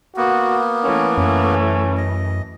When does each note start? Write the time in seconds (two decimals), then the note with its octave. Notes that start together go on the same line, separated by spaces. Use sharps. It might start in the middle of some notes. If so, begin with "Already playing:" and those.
0.17 A#3 B3 F#4
0.84 E3 A3 C#4
1.18 F#2 C#4
1.97 D#5